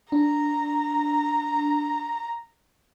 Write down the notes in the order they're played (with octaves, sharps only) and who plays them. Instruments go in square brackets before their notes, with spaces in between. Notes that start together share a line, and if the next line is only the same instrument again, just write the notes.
[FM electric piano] D4 [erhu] A#5